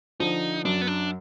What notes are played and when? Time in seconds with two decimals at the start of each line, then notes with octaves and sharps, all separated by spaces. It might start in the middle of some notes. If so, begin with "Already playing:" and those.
0.20 D3 F3 D#4
0.65 F#2 D4
0.82 B3
0.87 D4